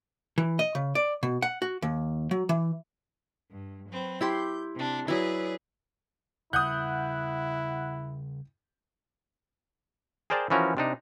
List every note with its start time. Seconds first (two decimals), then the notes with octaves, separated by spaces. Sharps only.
0.38 E3
0.59 D#5
0.75 C#3
0.95 D5
1.23 B2
1.42 F#5
1.62 F#4
1.82 D#2
2.31 F#3
2.49 E3
3.52 G2
3.89 F#3 C4 B4
4.21 E4 G4 C6 G6
4.75 C3 D4
5.08 F#3 E4 G#4 B4 D5
6.53 C#3 G3 E4 F#5 D#6 F#6 G6
10.30 G#4 A#4 C5 D5 G5 A5
10.50 E3 F3 C#4 F#4 A#4
10.77 C3 D4 D#4